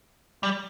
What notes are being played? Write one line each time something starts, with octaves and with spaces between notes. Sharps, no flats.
G3